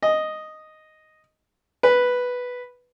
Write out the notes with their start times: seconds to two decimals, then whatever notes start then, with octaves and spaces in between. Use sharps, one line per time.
0.02 D#5
1.83 B4